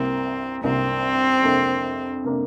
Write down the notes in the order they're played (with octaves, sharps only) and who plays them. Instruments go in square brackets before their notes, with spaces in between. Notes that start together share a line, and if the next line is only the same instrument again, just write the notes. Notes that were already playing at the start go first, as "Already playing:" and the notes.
Already playing: [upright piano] C2 C3 A#3 [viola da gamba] C4
[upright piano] C2 C3 A#3 [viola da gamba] C4
[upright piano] F2 C3 A#3 D4
C3 A#3 D4